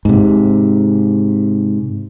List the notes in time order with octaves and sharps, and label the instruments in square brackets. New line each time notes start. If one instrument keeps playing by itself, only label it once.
[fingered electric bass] G#2 C3